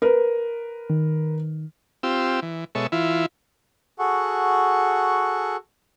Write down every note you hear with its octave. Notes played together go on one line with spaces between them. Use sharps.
A#4 B4
D#3
C4 F4 G4 E6
E3
B2 G#3 A4 C#5 E5
E3 E4 F4
F#4 G#4 A4 F#5 C#6